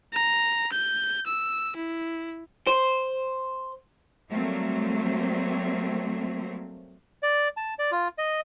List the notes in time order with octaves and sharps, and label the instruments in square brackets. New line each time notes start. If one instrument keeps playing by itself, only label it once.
[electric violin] A#5
G6
E6
E4
[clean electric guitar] C5
[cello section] F#3 G3 A3 A#3 C4
[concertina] D5
A5
D5
F4
D#5